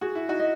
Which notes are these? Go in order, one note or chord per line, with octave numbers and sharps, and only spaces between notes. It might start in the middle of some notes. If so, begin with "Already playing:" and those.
F#4 G#4
E4
D#4 F#4
D#5